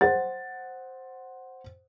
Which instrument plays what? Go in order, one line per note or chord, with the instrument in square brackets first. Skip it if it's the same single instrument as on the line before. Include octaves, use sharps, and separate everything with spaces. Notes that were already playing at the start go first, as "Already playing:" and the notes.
[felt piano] C5 F#5 A6